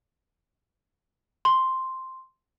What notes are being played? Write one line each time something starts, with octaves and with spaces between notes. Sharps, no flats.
C6